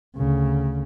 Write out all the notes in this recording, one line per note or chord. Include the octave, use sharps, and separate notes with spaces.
D2 C#3